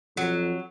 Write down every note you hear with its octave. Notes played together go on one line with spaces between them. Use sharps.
F2 F#3